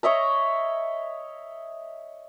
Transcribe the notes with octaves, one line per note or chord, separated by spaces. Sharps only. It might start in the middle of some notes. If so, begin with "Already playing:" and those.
C#5 D#5 E5 A#5